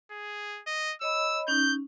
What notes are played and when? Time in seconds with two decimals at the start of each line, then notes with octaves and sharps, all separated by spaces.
0.11 G#4
0.67 D#5
1.01 C#5 D#5 B5 E6
1.48 C#4 D#4 G6